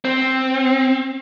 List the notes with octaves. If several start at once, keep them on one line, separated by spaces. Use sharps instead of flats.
C4